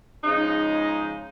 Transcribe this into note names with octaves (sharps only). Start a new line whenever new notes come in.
C#3 F3 G#3 D#4